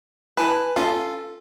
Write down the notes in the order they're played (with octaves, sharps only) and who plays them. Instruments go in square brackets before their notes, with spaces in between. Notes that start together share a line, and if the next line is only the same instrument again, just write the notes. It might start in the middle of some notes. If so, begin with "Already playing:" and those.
[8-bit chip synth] E4 G#5 A5 [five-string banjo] B4
[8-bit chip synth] C#4 F4 F5 [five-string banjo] A4